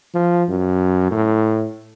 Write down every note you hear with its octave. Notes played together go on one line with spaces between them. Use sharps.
F3
F#2
A2